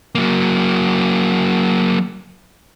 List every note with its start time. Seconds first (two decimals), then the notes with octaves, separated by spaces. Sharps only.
0.15 F#3 A#3